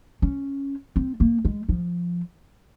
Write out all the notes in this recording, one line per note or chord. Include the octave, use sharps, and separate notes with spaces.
C#4
C4
A#3
G#3
F3